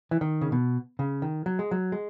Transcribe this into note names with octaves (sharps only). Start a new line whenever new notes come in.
E3
D#3
C#3
B2
C#3
D#3
F#3
G#3
F#3
G#3